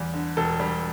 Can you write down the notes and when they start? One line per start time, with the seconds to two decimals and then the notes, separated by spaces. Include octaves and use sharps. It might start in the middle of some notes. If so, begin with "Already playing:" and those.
Already playing: E2 G3
0.14 D3
0.37 E1 A4
0.60 G3